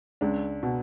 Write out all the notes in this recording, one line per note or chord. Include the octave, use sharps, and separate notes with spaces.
C#2 D4
B2